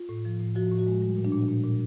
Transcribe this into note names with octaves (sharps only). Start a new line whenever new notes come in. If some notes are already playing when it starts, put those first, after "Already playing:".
Already playing: F4
A2
F3
A2
F3 F#4
A2
F#4
G#3
G3
A#2
D4
A#2
A#2
A#2